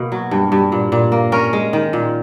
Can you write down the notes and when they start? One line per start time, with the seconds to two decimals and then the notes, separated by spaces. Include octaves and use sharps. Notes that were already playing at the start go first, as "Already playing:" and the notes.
Already playing: B2 A#3
0.12 F#3
0.31 G2
0.52 G2
0.72 A#2
0.92 A#2
1.12 A#3
1.32 C#4 A#4
1.53 G#3
1.73 D#3
1.93 A#2